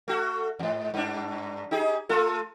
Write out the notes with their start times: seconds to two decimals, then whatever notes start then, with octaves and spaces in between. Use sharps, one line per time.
0.08 A3 F#4
0.59 E2 G#2
0.94 G2 D4
1.71 D#4 G4 G#4
2.09 A3 F4 A4